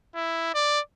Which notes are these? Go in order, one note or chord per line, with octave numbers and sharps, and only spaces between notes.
E4
D5